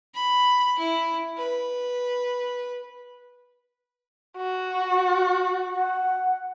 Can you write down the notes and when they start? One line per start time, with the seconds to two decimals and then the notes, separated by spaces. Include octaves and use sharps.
0.15 B5
0.78 E4
1.37 B4
4.37 F#4
5.75 F#5